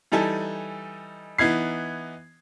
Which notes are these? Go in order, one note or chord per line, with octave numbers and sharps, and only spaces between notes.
E3 G3 D#4 A4 G#5
E3 B3 D#4 G#6 C7